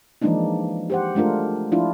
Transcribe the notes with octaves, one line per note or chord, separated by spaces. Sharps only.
E3 F3 G#3 A#3 D4 D#4
G4 C5 F#5
G#3 A3 D4 F4 A#4
F3 D4 E4 F4